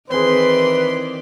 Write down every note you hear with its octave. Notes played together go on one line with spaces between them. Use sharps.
D#3 E3 C4 G#4 B4 D5 C6